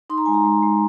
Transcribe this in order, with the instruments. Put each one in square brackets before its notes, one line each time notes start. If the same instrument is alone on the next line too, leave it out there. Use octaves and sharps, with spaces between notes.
[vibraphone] D#4 C6
A#5
G#3 G#5
A#5
G#3
G#3